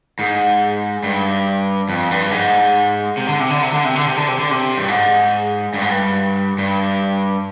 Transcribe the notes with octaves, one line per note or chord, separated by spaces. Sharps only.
G#2
G2
F2
G2
G#2
C3
D3
C3
D3
C3
D3
C3
D3
C3
D3
C3
D3
C3
G2
G#2
G2
G#2
G2
G2